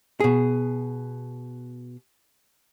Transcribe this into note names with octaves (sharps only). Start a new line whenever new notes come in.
B2 G#4